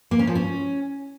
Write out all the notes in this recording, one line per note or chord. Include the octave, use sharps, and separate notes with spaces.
A#3
C#4
F3
C#4